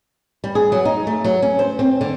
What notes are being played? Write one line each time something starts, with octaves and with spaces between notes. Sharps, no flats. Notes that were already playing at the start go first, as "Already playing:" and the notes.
G3
G#4
F#3
D#4
A3
F#3
C#4
C5
C4
D3